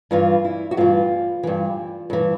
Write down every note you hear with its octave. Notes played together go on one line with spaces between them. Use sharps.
G2 E3 F4
E4
F#4
G2 E3 F4
G2 E3
G2 E3